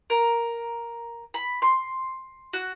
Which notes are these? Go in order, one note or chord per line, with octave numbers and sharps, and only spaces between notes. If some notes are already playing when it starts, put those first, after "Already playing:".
A#4
B5
C6
F#4